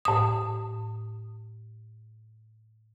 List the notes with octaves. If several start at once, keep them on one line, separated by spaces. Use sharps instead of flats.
A2 D#6